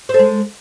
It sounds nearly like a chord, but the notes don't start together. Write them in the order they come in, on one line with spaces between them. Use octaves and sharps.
C5 A4 G#3